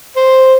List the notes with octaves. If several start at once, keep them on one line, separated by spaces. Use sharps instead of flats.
C5